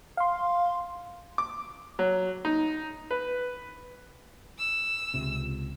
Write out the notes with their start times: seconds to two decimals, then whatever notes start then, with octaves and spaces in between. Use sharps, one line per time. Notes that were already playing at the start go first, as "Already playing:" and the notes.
0.17 F5 C6
1.38 D6
1.99 F#3
2.45 D#4
3.11 B4
4.59 E6
5.14 C#2 C3